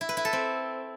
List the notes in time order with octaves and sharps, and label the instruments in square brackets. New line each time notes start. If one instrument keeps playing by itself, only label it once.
[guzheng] E4
B4
E4
A4
C4